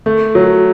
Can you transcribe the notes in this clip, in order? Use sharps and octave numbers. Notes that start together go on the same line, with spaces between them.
A3
F#3